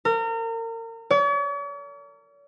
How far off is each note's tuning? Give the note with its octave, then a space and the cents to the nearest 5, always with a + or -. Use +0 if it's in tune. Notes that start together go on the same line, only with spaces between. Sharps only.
A#4 -35
C#5 +45